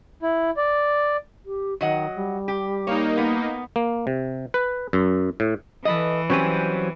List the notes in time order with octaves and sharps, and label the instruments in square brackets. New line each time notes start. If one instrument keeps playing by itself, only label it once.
[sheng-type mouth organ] E4
D5
[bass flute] G4
[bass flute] D#3 [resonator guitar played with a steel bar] F#3 D#5 F#5
[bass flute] G3
[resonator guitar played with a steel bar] G4
[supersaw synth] A#3 D#4 [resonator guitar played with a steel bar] C#5
[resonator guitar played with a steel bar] B3
[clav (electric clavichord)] A#3
C3
B4
F#2
A2
[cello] E3 [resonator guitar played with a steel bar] A4 B4 D#5
[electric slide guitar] F#3 C5 G#5 [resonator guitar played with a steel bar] G3 C4 C#4